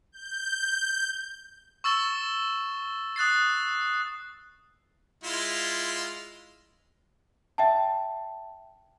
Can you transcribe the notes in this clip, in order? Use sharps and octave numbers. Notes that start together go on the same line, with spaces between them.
G6
C#6 E6 A6 E7 G7
D#6 F#6 A6 C7
G#3 E4 F4
E5 G5 A5